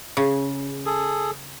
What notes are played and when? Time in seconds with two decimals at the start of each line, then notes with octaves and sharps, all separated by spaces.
0.17 C#3
0.86 G#4 A4